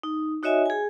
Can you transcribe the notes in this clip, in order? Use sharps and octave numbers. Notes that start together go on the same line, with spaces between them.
D#4
D#4 F#4 C#5 D#5 E5 G#5
G#4 G#5